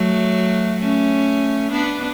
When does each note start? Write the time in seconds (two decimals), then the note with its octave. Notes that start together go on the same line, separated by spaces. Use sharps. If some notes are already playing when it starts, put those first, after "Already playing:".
Already playing: F#3 A3
0.80 A3 C#4
1.72 B3 D4